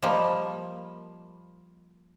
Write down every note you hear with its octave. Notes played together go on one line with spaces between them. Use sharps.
F3 G3 A#3 D#5 B5